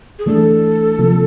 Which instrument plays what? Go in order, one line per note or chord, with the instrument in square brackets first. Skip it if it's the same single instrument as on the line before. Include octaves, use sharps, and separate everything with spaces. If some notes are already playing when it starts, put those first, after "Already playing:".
[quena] G#4
[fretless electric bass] E3 A3 D4 [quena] A4
[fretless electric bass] C3 F3 A#3